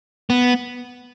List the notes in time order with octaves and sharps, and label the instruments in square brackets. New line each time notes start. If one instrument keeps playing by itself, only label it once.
[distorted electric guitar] B3